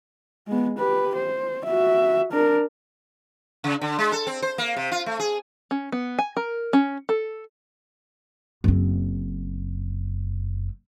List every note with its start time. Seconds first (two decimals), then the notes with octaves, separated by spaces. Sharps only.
0.48 G#3 B3
0.79 G4 B4
1.16 C5
1.66 F#4 E5
2.33 D4 A#4
3.64 C#3
3.82 D3
3.99 G#3
4.12 A4
4.27 C4
4.42 C5
4.58 A#3
4.76 C3
4.91 F4
5.06 A3
5.19 G#4
5.71 C#4
5.92 B3
6.19 G#5
6.37 A#4
6.73 C#4
7.09 A4
8.64 F#1 C4